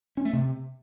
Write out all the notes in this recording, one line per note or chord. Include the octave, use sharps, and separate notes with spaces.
C#4
A3
C3